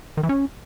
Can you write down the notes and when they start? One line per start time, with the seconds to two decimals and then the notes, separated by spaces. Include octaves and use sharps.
0.17 D#3
0.23 E3
0.29 C#4